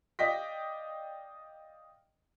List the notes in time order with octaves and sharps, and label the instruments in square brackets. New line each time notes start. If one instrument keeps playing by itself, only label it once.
[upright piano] D5 D#5 F5 G5 A#6 B6